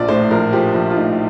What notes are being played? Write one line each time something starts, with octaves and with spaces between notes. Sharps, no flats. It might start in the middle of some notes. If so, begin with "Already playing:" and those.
Already playing: A#1 F3 D5
A2 C5
A#1 A#4
F3 G4
A#1
F4
A2 D#4